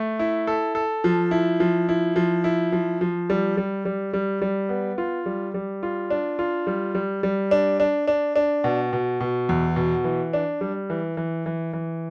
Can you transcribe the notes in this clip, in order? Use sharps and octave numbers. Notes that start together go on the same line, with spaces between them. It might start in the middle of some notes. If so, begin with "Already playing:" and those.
Already playing: A3
E4
A4
A4
F3
E4
F3
E4
F3
E4
F3
F3
G3
G3
G3
G3
G3
B3
F4
G3
G3
F4
D4
F4
G3
G3
G3
D4
D4
D4
D4
B2
B2
B2
E2
B2
E3
D4
G3
E3
E3
E3
E3